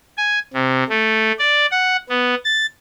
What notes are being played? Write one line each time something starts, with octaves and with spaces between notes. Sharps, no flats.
G#5
C3
A3
D5
F#5
B3
A6